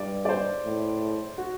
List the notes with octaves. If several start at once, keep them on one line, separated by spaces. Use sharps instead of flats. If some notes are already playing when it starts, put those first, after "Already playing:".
Already playing: G2 D5
D5
C5
A2
F#4